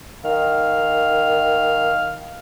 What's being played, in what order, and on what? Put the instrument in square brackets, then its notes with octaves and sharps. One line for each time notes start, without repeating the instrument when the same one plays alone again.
[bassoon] D#3 [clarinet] F5